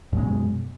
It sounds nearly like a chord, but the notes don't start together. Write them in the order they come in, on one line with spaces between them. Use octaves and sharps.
F#2 G#3 B2